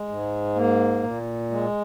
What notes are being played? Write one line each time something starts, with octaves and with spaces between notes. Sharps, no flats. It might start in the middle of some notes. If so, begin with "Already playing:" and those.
Already playing: G#3
G#2
A#3
A#2
G#3